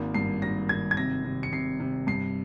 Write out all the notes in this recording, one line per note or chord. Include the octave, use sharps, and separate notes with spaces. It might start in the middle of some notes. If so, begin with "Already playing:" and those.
Already playing: G#1 A#3
G2 C7
G#1 A#6
G#1 G#6
G#6
C3 A#6
C3
C#7
C3 C7
C3
G2 C7